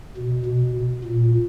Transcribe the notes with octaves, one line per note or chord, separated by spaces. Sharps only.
B2
B2
A#2